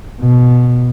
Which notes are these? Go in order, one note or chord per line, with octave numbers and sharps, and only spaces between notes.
B2